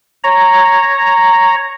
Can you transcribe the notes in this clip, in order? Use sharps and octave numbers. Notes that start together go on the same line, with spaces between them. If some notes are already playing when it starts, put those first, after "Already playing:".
C#5 A#5